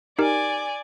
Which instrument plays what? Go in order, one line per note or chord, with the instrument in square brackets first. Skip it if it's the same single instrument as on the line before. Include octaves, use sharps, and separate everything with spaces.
[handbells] D#4 G4 A#4 [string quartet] D5 G#5